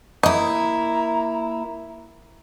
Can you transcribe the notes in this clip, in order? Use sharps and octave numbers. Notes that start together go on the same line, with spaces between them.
A#3 E4 D#5 A#5